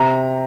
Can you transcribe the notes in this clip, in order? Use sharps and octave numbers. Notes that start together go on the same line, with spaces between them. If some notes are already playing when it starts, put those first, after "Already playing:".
Already playing: C3 A#5